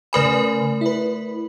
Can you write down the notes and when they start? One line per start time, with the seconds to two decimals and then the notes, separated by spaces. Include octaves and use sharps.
0.13 C#3 A3 A#4 B4 G#5 B5
0.81 E4 B4